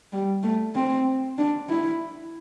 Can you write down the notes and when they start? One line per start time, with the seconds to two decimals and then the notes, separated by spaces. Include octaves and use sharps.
0.13 G3
0.43 A3
0.75 C4
1.38 D4
1.69 E4